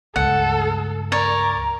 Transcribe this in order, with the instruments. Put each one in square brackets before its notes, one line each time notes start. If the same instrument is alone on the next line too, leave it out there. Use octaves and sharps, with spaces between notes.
[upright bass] C#2 G2 [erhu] A4 [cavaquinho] F#5
[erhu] A#4 [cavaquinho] C#5 D5